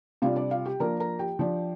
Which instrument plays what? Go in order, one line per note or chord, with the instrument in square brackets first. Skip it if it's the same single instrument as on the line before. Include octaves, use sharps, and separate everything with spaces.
[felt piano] C3 G3 D4 F4 F5
D4 D5
F4 F5
G4 G5
F3 A#3 D4 A#4 A#5
A#4 A#5
G4 G5
F3 D4